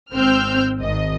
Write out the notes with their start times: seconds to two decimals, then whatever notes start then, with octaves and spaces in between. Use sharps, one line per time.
0.14 G#1 C4 E6 F6 G6
0.79 G#1 G#2 D#5